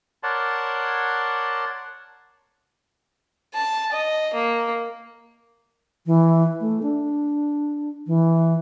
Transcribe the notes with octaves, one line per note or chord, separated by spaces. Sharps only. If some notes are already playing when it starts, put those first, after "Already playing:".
A#4 C#5 D5 F#5 A5 C6
A5
D#5
A#3
E3
A3
D4
E3